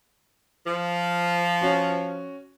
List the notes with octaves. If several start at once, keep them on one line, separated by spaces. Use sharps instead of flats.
F3
C#4 F#4